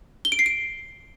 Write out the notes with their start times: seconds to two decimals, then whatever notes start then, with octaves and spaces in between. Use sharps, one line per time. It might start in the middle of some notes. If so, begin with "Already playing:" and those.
0.25 G7
0.32 D7
0.39 C7
0.46 D7